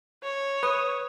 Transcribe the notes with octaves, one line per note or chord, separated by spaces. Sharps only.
C#5
B4 D#6